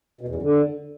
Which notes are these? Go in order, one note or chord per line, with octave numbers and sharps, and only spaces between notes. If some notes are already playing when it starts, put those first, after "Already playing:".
B2
E2
F#2
D3